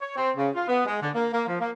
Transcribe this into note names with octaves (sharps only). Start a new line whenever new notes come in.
C#5
C4
C#3
F4
B3
G#3
D3
A#3
A#3
F3
A#3